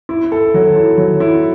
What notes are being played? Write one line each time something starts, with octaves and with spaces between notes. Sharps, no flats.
E4
A4
F#3
E4
F#3
E4